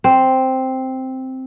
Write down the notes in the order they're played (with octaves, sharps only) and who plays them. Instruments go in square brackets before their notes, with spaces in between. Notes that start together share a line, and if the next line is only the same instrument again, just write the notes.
[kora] C4